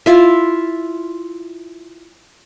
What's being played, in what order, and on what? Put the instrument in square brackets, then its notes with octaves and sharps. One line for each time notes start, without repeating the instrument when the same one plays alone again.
[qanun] E4 F4 E5